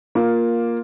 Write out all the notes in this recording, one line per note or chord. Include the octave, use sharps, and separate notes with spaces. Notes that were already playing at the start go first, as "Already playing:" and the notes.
A#3 F4